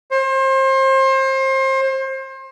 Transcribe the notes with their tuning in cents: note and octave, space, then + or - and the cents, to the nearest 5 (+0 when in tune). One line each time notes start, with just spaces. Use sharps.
C5 +30